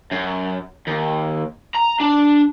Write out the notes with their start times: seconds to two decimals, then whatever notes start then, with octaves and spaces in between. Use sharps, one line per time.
0.12 F#2
0.88 D#2
1.75 A#5
2.00 D4